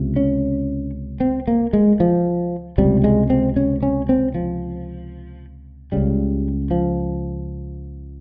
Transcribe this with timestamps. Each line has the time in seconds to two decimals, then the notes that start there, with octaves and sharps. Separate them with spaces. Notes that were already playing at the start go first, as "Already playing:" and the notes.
Already playing: C#2 C3
0.16 C#4
1.20 C4
1.48 A#3
1.73 G#3
2.00 F3
2.78 C#2 C3 G3
3.04 G#3
3.30 C4
3.56 C#4
3.83 C#4
4.09 C4
4.35 F3
5.92 C#2 C#3 G3
6.71 F3